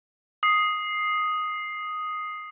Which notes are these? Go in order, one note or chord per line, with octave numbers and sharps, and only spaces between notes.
D#6 C7